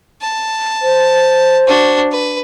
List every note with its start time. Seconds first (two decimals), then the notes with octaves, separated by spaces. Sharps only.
0.22 A5
0.82 C5
1.67 D4 F#4
2.12 B4